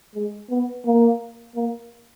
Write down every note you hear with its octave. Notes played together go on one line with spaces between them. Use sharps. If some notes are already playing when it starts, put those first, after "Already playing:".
G#3
B3
A#3
A#3